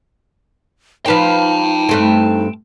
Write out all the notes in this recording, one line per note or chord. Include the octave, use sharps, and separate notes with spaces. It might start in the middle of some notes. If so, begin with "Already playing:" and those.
F3 D#4 B4 C5 G5 A5
G2 A3 C4